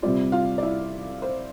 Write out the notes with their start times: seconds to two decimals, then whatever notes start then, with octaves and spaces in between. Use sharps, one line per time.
0.02 C3 G3 C4 F4 D5
0.32 F4 F5
0.58 D5
0.63 E4 E5
1.22 C5